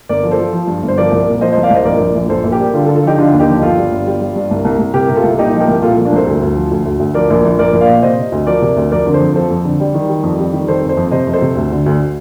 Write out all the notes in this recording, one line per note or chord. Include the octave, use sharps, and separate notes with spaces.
G1 A#4 D5
F3
A4 C5
F3
F3
G2
G1
C5
F3 A#4 D5
C2
A#2
F3 C5 D#5
C5 D#5
C2
D5 F5
C2 C5 D#5
A#1 A#4 D5
A#1
A#1
A#1 A4 C5
A#1
G4 A#4
G3
D3 F4 A4
F4 A4
D3
F4 A4
F3 D#4 G4
D3 D4 F4
D#2
D#4 G4
F3
G1 F4 A4
G3
G1
G3
G3
G2
C2
C2
C2
C3 G4 A#4
C3 A#4
F4 A4
C2
A#2 D#4 G4
F3
G4 A#4
C2
A#2 F4 A4
F3
A#3 D4
C2 A4 C5
D2
D2
F3
D2
D2
D2
F3 A#4 D5
A#1
A#1
A#1 A#4 D5
A#1
D5 F5
A#2
C3 C5 D#5
C3
D2
F3 A#4 D5
C3
D2
F2 A#4 D5
D3
A4 C5
F2
F3 A4 C5
F2
D3
G3
D#3
G3
F2
G3
D#3
F1 A4 C5
F1
A4 C5
F2
C3 C5 D#5
F2
A4 C5
C3
D2
D3
D2